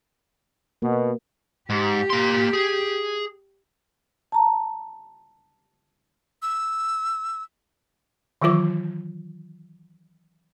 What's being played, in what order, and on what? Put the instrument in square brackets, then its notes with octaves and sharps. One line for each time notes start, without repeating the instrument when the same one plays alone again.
[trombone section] B2 [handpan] A#3
[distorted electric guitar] G#2 [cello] G4
[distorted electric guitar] A#3 C6
G#4
[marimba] A5 A#5
[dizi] E6
[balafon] D#3 E3 F#3 F4 D6